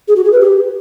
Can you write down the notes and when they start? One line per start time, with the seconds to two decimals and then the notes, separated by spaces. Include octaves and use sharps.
0.08 G#4
0.16 F#4
0.24 G#4
0.32 B4
0.40 G4